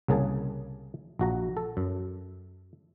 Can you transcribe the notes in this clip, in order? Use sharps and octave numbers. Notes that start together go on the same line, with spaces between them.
C2 C#3 A#3 G#4 A5
A#1 F#4 A#5
A4
F#2